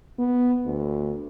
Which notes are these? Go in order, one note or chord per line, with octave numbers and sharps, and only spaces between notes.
B3
D2